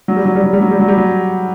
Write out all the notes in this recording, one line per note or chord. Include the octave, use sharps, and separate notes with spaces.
F#3
G3
F#3
G3
F#3
G3
F#3
G3
F#3
G3
F#3